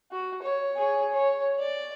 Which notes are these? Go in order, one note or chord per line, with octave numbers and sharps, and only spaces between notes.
F#4
C#5
G#4 C#5
C#5
D5